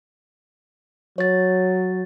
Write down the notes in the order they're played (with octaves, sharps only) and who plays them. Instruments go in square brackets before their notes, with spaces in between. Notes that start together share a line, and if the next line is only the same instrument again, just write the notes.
[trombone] F#3 [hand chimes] C#5 A6